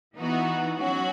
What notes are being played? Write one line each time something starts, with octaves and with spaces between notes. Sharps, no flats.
E3 B3 D#4 F#4
F#3 C#4 F#4